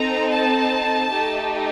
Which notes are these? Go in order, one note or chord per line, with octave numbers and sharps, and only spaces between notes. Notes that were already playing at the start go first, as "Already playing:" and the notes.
Already playing: C4 D#4 A4 A#5
A5
A3 D#4 G4